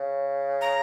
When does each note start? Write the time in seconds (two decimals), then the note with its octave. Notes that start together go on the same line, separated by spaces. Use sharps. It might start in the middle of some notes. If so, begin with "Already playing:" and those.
Already playing: C#3
0.61 A#5